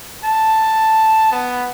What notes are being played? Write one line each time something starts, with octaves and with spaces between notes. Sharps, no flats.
A5
B3